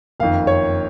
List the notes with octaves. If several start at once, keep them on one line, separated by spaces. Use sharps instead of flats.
F#1 F2 D#3 F5
C#5